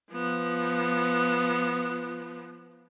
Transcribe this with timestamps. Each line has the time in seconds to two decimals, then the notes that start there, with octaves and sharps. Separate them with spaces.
0.11 F3 B3